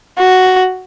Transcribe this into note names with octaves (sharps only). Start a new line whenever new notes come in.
F#4